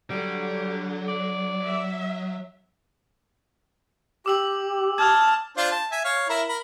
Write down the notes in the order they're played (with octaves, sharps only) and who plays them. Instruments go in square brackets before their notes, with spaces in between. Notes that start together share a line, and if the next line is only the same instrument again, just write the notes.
[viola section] D3 [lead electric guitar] F#3 [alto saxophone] G3
[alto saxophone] D5
[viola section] E5
[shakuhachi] G4 [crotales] D6 E6 F#7
[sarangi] A5 [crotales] D#6 F6 G#6
[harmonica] D4 F4 C5
A5
E5 G#5
C#5 F5
E4 A#4 E5
A#4 B5